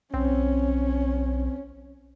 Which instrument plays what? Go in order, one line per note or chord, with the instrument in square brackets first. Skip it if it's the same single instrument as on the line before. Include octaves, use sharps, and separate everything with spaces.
[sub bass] B1 [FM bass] C4 [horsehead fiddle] C#4